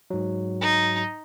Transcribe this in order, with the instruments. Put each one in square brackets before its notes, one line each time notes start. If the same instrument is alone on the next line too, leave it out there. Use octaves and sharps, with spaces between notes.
[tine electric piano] G#2 F#3
[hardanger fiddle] D#4